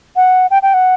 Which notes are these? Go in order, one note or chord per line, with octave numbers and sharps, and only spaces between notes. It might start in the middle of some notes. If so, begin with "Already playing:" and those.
F#5
G5
G5
F#5